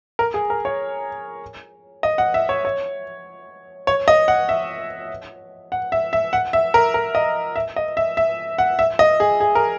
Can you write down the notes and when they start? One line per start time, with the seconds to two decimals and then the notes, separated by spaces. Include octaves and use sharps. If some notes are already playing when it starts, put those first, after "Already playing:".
0.19 A#4
0.34 G#4
0.50 A#4
0.65 C#5
2.03 D#5
2.18 F#5
2.34 E5
2.49 C#5
2.65 C#5
3.87 C#5
4.08 D#5
4.28 F#5
4.49 E5
5.72 F#5
5.92 E5
6.13 E5
6.33 F#5
6.53 E5
6.74 A#4
6.94 A#4
7.15 D#5
7.56 E5
7.76 D#5
7.97 E5
8.17 E5
8.58 F#5
8.79 E5
8.99 D#5
9.20 G#4
9.40 G#4
9.55 A#4